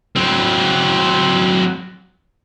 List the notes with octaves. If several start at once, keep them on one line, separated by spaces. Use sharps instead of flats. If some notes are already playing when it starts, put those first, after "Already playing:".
F#3 C4